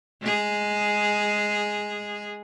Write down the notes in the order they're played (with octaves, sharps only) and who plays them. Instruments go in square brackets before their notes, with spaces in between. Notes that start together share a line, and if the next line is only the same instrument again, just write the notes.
[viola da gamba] G#3 G#4